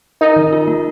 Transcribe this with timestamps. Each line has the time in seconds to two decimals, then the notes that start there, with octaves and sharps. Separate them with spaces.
0.21 D#4 A#4
0.36 D#3
0.53 F4
0.68 A#3